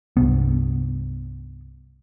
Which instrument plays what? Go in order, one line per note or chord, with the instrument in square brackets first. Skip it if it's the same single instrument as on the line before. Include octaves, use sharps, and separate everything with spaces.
[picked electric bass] C2 G2 C3 B3